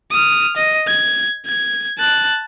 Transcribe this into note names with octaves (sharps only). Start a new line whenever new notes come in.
D#6 F6
D#5
G#6
G#6
A5 F#6